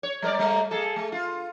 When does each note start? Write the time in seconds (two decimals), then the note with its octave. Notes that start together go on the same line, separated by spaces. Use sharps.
0.03 C#5
0.22 G3 A#4 D5
0.39 G3 A3 A#3
0.71 A#3 G#4 A4
0.96 A3
1.12 F4